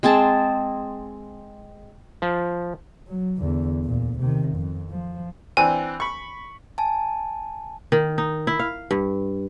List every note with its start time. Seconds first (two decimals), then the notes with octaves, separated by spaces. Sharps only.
0.03 G#3 C4 G#4 A5
2.22 F3
3.08 F#3
3.39 E2 D3
3.84 D2 A#2
4.19 C3 D#3
4.56 F2
4.90 F3
5.57 E3 C4 D4 G#5
6.00 B5 C#6
6.78 G#5 A5
7.92 D#3
8.18 D#4
8.47 E4
8.59 F5
8.91 G2